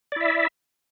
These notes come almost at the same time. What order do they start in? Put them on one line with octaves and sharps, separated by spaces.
D5 E4 E5